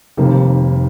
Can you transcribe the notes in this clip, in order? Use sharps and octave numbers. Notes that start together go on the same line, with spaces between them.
F1 F2 D#3 G3 A#3